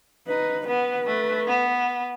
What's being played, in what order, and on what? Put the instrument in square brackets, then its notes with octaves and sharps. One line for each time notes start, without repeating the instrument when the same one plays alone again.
[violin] D#4 [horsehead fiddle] B4
[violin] B3 [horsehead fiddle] B4
[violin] A3
B3